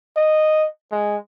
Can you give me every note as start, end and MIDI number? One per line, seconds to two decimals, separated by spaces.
0.17 0.67 75
0.92 1.17 56